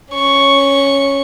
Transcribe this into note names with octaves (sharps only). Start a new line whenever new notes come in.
C#4 C#6